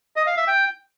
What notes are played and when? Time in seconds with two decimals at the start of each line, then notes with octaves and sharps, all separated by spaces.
0.16 D#5
0.27 F5
0.37 E5
0.47 G5